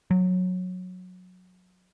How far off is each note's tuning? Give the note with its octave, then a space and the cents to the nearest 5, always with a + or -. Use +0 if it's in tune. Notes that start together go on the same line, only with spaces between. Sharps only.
F#3 -20